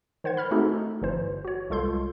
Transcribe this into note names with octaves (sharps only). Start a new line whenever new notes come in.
D#3 C5 F#5 G#6
B5 F6 G#6
A3 C4 D#4 F#4 G#4 A4
G1 E3 C5
F#4 C#5
C2 G#3 F4 A4 C6 G6